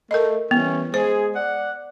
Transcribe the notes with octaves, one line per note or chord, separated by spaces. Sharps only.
A3 A#4 D#5
E3 G3 B3 C#4
G#3 G#4 C5
D5 F#5